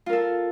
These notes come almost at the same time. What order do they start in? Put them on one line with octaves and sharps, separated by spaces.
F4 A#4 A4